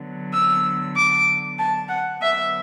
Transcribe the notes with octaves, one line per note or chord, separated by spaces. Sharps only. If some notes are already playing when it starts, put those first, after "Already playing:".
Already playing: D3 F#3 B3
E6
D6
A5
F#5
D3 F#3 B3 E5